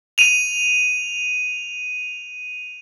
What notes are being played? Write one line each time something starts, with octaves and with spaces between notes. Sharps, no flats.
D#7 F7